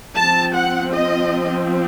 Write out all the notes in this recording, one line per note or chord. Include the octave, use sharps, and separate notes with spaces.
F3 C4 A5
F#5
D#5